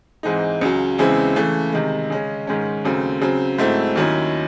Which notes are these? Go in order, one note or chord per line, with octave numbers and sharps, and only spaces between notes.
G#2 E3 G#3 C4 D#4
C#2 C#3 F#3
E2 C#3 G#3 C4 E4
C#3 E3 A3
C3 D#3 G#3
C#3 G#3 C#4
G#2 D#3 G#3 C#4
D#2 C#3 F#3 A3 C4
C#3 F#3 C4
G#2 F#3 A3 C4 E4
D#2 D#3 F#3 C#4 E4